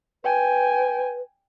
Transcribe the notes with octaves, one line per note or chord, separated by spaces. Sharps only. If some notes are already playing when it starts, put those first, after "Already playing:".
B4 G5 G#5